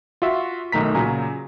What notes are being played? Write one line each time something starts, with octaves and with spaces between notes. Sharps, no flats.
F4 F#4 E5
B1 D#3 A3 A#5 B6
A#2 C#3 F#3 G#5 A#5